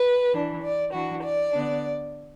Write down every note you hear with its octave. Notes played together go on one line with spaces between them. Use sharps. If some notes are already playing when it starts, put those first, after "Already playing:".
Already playing: B4
E3 D4
D5
E3 D4 F#4
D5
D3 B3 D4